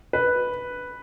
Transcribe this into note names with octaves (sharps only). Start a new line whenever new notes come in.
B4